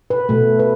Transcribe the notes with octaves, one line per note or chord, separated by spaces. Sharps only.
B4
B2 A3
B4